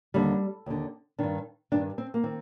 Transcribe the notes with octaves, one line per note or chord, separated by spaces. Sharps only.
D#2 D3 G3
D#2 D3
G2 D#3 D4
G2 D#3 D4
C4
A#3
D#3 C4